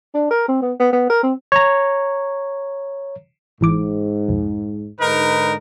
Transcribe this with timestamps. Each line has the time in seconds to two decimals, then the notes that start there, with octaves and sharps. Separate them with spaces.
0.14 D4
0.31 A#4
0.48 C4
0.62 B3
0.79 B3
0.93 B3
1.10 A#4
1.23 C4
1.52 C#5 A#5
3.61 G#1 G#2 E3 D6
4.29 B1 F2
5.00 G#2 D3 D#4 A#4 B4